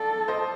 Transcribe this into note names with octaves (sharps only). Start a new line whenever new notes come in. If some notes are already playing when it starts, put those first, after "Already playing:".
Already playing: A4 D5 F5
C5 D#5